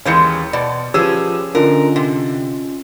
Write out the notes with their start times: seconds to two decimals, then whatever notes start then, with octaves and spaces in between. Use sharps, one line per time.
0.05 D#2 E3 G#3 C#4 G6 C#7
0.53 B2 D5
0.94 F3 C#4 G4 G#4 B4 E6
1.55 D3 C#4 F4 A#4 D#5
1.96 C3